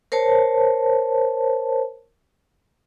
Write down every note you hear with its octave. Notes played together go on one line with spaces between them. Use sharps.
A#4 C5 C#5 A5